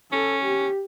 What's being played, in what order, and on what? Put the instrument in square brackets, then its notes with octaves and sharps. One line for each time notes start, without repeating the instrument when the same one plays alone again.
[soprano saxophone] C#4 [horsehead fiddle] A4
[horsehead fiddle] G4